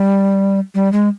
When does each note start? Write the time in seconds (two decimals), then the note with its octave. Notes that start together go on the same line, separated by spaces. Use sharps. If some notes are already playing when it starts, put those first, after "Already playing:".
Already playing: G3
0.75 G3
0.93 G#3